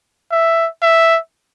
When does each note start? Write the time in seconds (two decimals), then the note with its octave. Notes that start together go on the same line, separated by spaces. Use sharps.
0.31 E5
0.82 E5